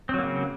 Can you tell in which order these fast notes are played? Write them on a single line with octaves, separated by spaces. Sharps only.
C4 F#3 A#3 C#3